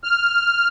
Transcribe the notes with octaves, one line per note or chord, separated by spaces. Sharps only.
F6